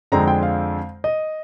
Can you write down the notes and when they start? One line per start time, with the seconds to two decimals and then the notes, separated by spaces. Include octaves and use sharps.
0.12 F2 D3 G#3 C4 A#5
0.28 G5
0.43 F5
1.04 D#5